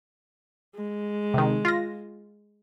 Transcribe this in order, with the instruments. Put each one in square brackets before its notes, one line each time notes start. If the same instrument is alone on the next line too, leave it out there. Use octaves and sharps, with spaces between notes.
[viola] G#3
[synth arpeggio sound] C3 D#3
F4 A#6